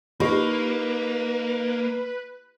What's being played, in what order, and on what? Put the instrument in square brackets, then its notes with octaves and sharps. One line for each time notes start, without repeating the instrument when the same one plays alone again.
[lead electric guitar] A#3 [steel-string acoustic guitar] D#4 [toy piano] F4 G4 [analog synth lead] B4